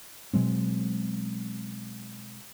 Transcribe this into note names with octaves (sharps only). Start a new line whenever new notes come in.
B2 F#3 G#3 C4